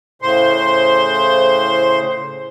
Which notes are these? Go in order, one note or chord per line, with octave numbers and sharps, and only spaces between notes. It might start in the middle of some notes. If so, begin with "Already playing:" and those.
A2 C#3 C5 C6